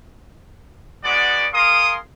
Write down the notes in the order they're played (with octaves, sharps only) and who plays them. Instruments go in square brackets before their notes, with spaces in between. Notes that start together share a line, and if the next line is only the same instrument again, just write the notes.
[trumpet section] G#3 B3 F#4 D5
G#4 A#4 F5 C6 D#6